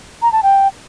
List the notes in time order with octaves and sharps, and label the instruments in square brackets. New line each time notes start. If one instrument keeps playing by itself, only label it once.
[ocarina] A#5
A5
G5